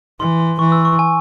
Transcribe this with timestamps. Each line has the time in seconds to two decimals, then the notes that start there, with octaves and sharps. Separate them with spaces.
0.20 E3 C6
0.40 C6
0.59 E3 C#6
0.72 E6
0.85 C#6
0.99 G#5